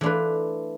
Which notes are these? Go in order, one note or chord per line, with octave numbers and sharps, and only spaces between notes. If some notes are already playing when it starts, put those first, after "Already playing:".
E3 A3 D4 F4 B4